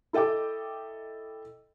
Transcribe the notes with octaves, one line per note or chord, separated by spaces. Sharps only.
E4 A4 D#5 G5 D6